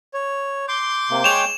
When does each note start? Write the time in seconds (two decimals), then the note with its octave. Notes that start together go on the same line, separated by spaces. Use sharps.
0.14 C#5
0.68 C6 D6 G6
1.11 C3 A#3
1.24 G#3 C#5 G5 E7 F7